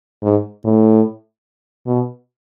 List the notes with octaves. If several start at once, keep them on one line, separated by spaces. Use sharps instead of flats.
G#2
A2
B2